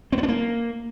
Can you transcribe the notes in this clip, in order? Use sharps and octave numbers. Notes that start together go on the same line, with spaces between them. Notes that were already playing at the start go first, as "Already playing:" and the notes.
C4
B3
D4
A#3